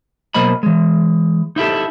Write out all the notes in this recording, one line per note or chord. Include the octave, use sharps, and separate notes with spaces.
B2 F#3 A#3 C5 D#5 B5
E3 G#3
D#4 E4 G4 A4